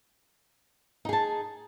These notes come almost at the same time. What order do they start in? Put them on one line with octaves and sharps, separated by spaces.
D#4 G#4 A5